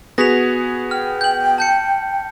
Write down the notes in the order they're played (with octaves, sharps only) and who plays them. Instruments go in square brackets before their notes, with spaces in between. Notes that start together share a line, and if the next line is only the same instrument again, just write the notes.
[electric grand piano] B3 F#4 G#4 [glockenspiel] A#6 B6 F7
[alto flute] G5 [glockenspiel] F6
[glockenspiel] G6 F#7
A5 G6 C#7